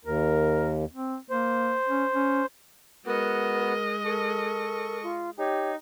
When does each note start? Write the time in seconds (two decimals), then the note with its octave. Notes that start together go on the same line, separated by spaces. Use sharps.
0.05 D#2 A#4
0.93 C4
1.30 A#3 C5
1.89 C#4
2.15 C#4
3.06 G#3 B3 F#4 A#4 D#5
4.06 A4 A#4 C#6
5.03 F4
5.38 D#4 G4 C#5